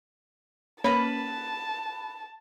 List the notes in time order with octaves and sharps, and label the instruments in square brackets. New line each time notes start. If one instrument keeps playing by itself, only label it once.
[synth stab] A#3 C#4 [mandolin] B4 B5 [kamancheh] A5